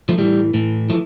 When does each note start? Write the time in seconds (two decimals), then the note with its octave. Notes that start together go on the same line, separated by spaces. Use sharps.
0.09 F3 A3
0.18 A2 E3 G3
0.54 A2 E3
0.90 E3 F3 A3